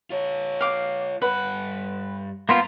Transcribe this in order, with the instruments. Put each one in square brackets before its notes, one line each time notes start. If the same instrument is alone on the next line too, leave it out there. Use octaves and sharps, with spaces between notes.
[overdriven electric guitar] F4 C#5
[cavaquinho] F5 D6
[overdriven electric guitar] G2 F#5 [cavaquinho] B4
[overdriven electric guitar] G2 A#5 [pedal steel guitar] A#3 B3 F4 [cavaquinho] C5